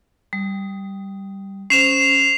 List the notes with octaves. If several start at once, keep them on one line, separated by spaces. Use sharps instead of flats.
G3
C#4 C5 C7 E7 F7